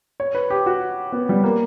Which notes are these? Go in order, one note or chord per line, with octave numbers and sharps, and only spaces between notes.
C#5
B4
G4
F#4
B3
G3
A#3